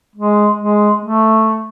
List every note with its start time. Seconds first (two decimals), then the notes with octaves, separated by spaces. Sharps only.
0.16 G#3
0.58 G#3
1.02 A3